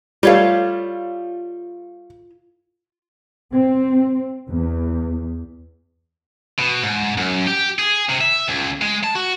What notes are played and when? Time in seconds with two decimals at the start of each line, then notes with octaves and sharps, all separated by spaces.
0.23 G3 A3 F4 C#5 F5
3.53 C4
4.50 E2
6.59 B2
6.84 G#2
7.18 F#2
7.47 G4
7.79 G#4
8.10 C3
8.21 E5
8.48 C#2
8.82 G#3
9.04 A5
9.15 F#4